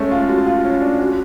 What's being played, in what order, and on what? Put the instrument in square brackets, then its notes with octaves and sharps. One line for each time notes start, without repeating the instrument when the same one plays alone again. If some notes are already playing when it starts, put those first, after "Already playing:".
Already playing: [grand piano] G#3 A3 C#4
F4
F#4
F4
C#4
D4
F#4